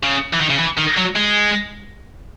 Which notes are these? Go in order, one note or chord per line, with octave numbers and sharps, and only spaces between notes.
C#3
E3
D#3
C#3
E3
D#3
F#3
G#3